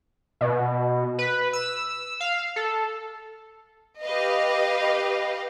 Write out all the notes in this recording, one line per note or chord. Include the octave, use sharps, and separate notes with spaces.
B2
B4
E6
F5
A4
G4 B4 D#5 F5